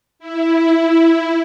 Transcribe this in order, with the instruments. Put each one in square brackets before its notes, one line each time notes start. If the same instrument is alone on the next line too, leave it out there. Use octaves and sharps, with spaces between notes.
[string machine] E4